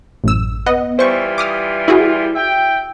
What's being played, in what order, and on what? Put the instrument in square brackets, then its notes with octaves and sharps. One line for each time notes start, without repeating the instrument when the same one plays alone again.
[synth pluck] A1 F#2 E6
B3 D#5 F#5
[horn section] E3 G3 F4 [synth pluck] C5 C#6
[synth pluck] D6 D#6 F6
E4 F#4 G#4
[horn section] E5 G5